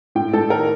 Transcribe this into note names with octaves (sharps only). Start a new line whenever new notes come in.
A2 G5
A2 A4
D#3 A#4